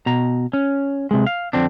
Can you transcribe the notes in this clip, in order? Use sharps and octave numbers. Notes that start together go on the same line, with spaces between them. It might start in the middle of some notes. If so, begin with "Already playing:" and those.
B2 A#5
C#4
C3 G#3
F5
F2 D3 C4 D4